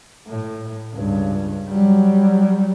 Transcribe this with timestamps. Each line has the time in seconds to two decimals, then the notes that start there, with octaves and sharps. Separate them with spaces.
0.28 A2
0.94 C#2 G2
1.69 F#3 G3